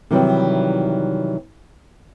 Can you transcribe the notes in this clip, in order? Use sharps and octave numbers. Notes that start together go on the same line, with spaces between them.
C3 D#3 E3 F#3 G3